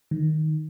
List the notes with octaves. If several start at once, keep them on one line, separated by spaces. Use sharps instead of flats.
D#3